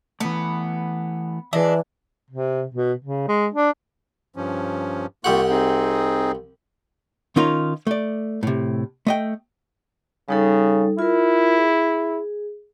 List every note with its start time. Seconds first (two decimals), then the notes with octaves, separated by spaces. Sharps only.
0.20 E3 A3 B3
1.53 E3 D4 G#4 D#5 E5
2.31 C3
2.74 B2
3.04 C#3
3.28 G#3
3.54 D4
4.36 G2 F3 C#4
5.24 C2 A#3 F4 G4 F#5 C#6
5.50 C4 D#4 G#4
7.36 D#3 C#4 D#4 F4 A#4 C#5
7.87 A3 D5
8.43 A2 C3
9.07 A3 D#5 G5
10.28 C#3 G3 D#4 A4
10.99 E4 F4 A#4
11.57 G#4